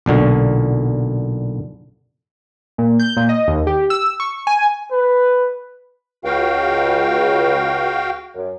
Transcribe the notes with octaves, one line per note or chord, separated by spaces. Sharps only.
B1 A#2 D3 F#4
A#2
G6
A#2
D#5
D#2
G4
E6
C#6
G#5
B4
C#2 F#4 F5 G5
F#2